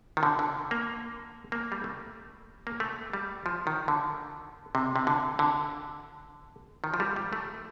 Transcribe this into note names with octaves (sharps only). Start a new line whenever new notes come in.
D#3
D3
D3
A#3
A#3
G3
A3
A#3
A3
G3
F3
D#3
D3
C3
C3
D3
D3
D#3
F3
G3
G3
A3